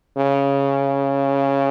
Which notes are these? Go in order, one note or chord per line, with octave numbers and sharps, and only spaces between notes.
C#3